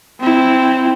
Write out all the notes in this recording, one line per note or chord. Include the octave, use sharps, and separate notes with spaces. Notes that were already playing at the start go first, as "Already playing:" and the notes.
C4 E4